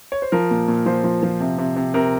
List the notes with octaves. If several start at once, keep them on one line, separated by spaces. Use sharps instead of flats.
C#5
C5
F3 A#4
A#2
A#2
F3 C5
F3
F3
C3
C3
C3
C3 A#4